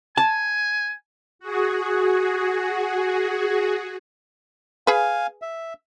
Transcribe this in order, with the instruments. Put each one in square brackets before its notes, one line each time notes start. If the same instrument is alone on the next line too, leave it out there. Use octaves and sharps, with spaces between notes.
[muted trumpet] G#5 [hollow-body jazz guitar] A5
[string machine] F#4 G#4
[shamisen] G#4 B4 [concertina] F5 G#5
[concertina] E5